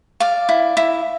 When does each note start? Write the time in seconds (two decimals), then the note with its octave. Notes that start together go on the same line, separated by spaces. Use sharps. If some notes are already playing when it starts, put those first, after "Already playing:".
0.20 D5 F5
0.49 E4
0.77 E4